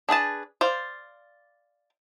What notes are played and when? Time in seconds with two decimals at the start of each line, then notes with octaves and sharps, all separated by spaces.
0.09 D4 G#4 B4 A5
0.61 C5 D5 F5